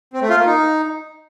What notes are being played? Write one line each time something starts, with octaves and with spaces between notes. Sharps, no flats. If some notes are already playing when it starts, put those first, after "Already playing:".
C4
A3
F4
A#3
D#4